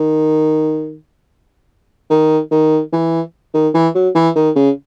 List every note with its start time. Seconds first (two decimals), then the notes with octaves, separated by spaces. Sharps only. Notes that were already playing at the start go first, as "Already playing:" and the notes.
Already playing: D#3
2.10 D#3
2.51 D#3
2.92 E3
3.54 D#3
3.74 E3
3.94 F#3
4.15 E3
4.36 D#3
4.56 C#3